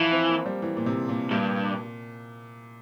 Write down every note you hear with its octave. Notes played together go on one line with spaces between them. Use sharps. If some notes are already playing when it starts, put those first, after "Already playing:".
Already playing: E3 F3
C4
A#3
G3
E3
A#2
C3
A#2
G2 A#2